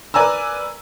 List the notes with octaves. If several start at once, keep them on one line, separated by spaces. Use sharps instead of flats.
A#4 B4 D5 G#5 A#5 E6